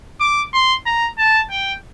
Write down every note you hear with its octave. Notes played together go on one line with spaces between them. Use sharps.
D6
C6
A#5
A5
G5